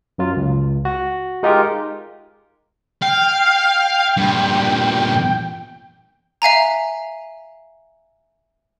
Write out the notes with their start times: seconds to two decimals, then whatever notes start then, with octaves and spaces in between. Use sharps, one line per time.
0.18 F#2 F#3 F4
0.36 C#2
0.85 F#4
1.43 G#3 D#4 F4 G4 A#4
3.02 F5 G5
4.17 G2 A#2
6.42 E5 F5 G#5 A#5